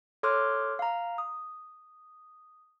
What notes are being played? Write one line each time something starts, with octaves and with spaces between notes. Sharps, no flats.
A4 C#5 C6 D6 F6 F#6
F5 A#5
D#6